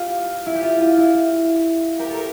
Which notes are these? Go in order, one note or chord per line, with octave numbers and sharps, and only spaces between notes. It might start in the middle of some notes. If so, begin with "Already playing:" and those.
Already playing: F4 G4
E4
G4
F4
F4
E4
G4 A#4
A4
A#4